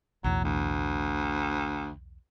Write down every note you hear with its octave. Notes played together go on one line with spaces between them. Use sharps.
B1 E2 A2 F#3
D2